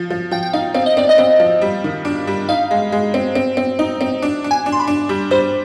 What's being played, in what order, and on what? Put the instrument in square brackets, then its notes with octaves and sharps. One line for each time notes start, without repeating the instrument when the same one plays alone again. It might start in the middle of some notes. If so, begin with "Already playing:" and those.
Already playing: [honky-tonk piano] F3
F3
[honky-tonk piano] F3 [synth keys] G5
[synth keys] G5
[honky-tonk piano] D#4 [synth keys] F5
[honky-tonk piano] C4 [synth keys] F5
[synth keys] D#5
[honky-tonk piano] C4 [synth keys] D5
[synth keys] D#5
[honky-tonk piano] C4
F3
G3
D#3
D4
G3
[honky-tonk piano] D#4 [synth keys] F5
[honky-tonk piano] G#3
G#3
C4
C4
C4
D#4
C4
D4
D4
[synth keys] G#5
[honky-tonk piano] D4
[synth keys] C6
B5
[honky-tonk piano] D4
G3
[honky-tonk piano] G3 [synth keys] C5